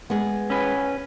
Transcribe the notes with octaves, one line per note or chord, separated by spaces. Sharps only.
G#3 B3
C#4 B4